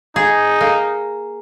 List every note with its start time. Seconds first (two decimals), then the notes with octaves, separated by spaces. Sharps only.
0.16 D#4 G#4
0.61 A#3